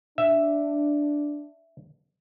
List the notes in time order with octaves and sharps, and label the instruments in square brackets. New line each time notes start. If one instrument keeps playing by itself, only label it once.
[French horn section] D4 [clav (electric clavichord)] E5